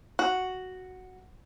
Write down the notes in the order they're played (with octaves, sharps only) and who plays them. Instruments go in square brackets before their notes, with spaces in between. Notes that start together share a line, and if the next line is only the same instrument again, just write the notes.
[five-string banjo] F#4